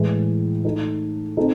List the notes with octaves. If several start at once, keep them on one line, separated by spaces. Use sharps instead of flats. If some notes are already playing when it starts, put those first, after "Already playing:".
Already playing: A2 E3 G#3
A3 D#4 A4
C4 D#4 A4